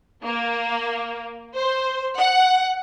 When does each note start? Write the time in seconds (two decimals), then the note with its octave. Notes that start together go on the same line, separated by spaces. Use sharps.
0.23 A#3
1.57 C5
2.18 F#5